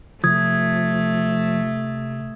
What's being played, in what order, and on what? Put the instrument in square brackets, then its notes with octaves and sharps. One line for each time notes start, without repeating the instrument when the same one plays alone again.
[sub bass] C3 [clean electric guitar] F3 [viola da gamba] A3 [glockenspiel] D#6 G#6